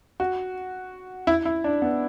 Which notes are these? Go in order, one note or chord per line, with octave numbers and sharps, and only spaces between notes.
F#4
E4
E4
D4
B3